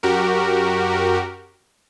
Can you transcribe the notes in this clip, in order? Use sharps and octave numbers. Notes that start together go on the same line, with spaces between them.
F#2 F#4 G4 A#4